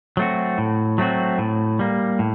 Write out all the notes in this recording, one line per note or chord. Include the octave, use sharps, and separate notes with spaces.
F#3 A3 C4 F#4
A2
F#3 A3 C4 F#4
A2
G3 A#3
A2